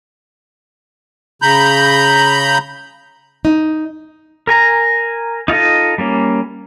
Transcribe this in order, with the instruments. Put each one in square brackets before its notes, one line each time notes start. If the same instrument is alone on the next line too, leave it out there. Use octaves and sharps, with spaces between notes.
[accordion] C#3 A#5 B5 G6
[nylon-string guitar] D#4
[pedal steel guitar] A#4 G#5 A#5
D#4 F4 A4 D#5
G3 A#3 C#4